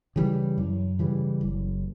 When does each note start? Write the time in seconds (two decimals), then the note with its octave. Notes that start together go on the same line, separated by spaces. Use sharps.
0.16 C#3 E3 G3
0.58 F#2
0.99 C#3 E3 G3
1.41 F#1